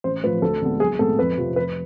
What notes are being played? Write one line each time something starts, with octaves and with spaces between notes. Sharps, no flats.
A1 C5
A2 F3 B4
D2 A4
D3 G#3 B3
B1 G#4
A2 G#3 B3 A4
F2 B4
C3 F3
F1 B4